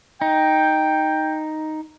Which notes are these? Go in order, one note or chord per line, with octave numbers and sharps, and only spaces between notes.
D#4 G5